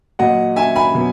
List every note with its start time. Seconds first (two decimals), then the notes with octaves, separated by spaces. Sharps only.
0.19 A#2 F#3 D#5 F#5
0.56 E5 G#5
0.76 G#5 B5
0.95 B2 F#3